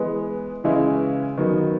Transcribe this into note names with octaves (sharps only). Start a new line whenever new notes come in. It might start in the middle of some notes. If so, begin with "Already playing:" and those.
Already playing: E3 G#3 B3
C#3 E3 G#3 C#4 E4
D#3 F#3 B3